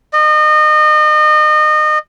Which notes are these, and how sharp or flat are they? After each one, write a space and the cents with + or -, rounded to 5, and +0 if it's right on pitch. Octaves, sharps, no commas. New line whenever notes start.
D#5 -30